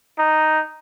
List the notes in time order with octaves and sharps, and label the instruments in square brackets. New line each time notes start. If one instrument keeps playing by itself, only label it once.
[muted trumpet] D#4